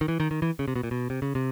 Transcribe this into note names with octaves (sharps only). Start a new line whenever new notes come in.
D#3
E3
D#3
D#3
E3
C#3
C3
B2
A#2
B2
C3
C#3
C3